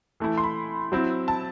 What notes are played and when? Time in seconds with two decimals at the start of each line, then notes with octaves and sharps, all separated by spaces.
0.20 E3 A3 E4
0.38 C6
0.44 B5
0.92 F#3 C4 E4
1.28 A5